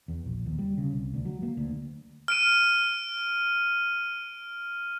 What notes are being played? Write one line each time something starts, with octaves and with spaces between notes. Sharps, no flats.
E2
A#1
D#2
G3
C#3
C2
D2
F#3
A#3
D2
F6 D7 D#7